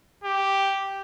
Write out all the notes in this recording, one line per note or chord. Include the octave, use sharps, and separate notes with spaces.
G4